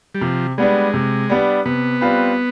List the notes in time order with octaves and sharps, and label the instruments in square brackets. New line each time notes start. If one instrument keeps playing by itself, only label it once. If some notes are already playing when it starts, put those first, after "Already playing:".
[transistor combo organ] G3
[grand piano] C3 [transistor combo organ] F3
[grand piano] G3 B3 D4 [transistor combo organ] G#3
[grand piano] C3
G3 B3 D4
[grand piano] C3 [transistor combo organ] B3
[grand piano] G3 C4 F4 B4